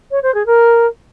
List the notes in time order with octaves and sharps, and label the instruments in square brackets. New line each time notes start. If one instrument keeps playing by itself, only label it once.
[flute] C#5
C5
G#4
A#4